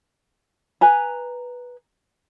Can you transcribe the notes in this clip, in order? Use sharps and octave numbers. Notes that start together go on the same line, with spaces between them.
B4 G#5 A#5